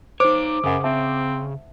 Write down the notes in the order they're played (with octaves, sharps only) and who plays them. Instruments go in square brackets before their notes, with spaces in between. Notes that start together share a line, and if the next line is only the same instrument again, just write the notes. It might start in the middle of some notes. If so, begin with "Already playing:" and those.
[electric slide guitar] D#4 C#5 [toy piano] C5 [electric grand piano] D6
[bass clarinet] F#2 [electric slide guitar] C#3 [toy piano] F#5 D#6
[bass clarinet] C4 [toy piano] E5 A5